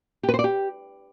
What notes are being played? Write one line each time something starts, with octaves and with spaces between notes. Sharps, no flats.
G4
B4
C5
D5
G4